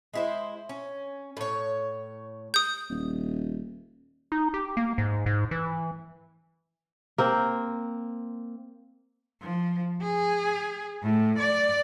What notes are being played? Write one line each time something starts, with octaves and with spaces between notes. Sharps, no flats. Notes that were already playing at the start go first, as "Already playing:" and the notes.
G#3 E4 C5
C#4
A2 C#5
D#6 G6
D#1
D#4
G4
A#3
G#2
G#2
E3
A#3 C4 C5
F3
G#4
A2
D5